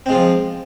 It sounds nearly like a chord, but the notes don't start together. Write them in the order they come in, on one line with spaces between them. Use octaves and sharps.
C4 G#3 F4 F3